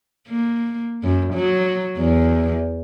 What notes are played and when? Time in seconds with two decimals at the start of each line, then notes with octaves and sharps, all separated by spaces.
0.28 A#3
1.03 F#2
1.34 F#3
1.98 E2